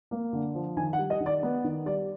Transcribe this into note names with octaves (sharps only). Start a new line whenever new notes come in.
A#3
D3
F3
D#3 G#5
F#5
G3
D#5
D#3
D5
B3
D#3
G3 D5